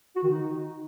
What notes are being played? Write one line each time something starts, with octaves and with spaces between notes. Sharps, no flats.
F#4
D#3
D#4